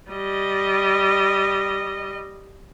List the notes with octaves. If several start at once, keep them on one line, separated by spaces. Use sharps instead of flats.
G3 D#5